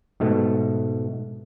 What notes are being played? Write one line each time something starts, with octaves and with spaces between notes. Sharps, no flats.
G#2 B2 A3